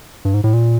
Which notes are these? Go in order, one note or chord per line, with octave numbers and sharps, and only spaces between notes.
G2
G#2
A2
A#2